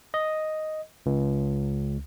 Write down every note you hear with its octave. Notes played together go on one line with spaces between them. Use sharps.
D#5
C#2